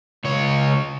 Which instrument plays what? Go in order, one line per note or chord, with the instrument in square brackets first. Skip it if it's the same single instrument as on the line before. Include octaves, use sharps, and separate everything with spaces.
[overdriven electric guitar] C#2 C#5